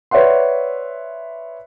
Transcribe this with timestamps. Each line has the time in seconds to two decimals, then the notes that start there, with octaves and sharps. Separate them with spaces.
0.11 B4 C#5 D5 E5 F#5 C6